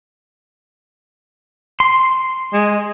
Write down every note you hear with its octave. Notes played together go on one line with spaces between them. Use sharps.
C6
G#3